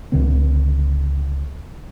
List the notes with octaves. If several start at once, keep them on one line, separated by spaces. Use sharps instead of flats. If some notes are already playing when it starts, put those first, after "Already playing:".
C#2 D3 C4